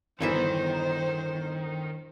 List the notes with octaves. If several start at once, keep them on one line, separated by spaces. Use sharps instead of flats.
G1 E2 A#2 D#3 E3 C5 E5